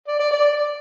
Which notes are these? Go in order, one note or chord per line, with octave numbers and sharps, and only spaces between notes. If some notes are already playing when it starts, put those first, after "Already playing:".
D5
D5
D5